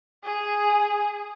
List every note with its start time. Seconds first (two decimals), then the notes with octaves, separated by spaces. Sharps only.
0.24 G#4